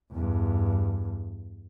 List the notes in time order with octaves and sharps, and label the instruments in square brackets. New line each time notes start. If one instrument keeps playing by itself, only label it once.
[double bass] E2 G2